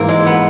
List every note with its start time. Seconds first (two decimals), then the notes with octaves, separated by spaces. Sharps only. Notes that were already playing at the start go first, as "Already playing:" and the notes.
Already playing: G#2 E3 A#3
0.09 G#3
0.26 B3